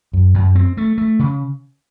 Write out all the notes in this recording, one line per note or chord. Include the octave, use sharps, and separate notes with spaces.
F#2
F#2
C4
A3
A3
C#3